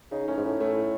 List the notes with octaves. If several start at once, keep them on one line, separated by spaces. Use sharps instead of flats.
C#3 D#4
A2 C#4
G#2
A2
A2 A3